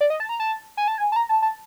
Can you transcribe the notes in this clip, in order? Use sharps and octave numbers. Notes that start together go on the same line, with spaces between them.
D5
D#5
A5
A#5
A5
G#5
A5
G#5
A5
A#5
A5
A5